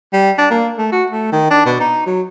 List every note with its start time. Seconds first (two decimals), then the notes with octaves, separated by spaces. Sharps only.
0.13 G3
0.38 D4
0.50 A#3
0.78 A3
0.92 F#4
1.10 A3
1.32 D#3
1.50 D4
1.66 B2
1.80 D#4
2.07 F#3